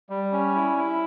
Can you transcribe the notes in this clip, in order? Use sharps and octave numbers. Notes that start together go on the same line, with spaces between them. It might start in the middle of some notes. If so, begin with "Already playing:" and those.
G3
C#4
E4
E4